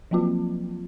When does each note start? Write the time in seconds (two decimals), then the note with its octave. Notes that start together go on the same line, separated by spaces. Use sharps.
0.11 F3 F#3 A#3 C4 F4